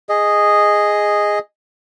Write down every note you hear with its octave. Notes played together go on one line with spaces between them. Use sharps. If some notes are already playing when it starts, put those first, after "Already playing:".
G#4 D#5